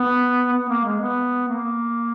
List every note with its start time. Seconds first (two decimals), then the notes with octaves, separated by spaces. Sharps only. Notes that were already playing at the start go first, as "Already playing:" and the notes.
Already playing: B3
0.53 B3
0.69 A#3
0.84 G#3
1.00 B3
1.48 A#3